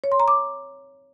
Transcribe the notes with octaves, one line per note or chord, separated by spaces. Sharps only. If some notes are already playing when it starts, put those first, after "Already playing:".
C#5
C6
A#5
D6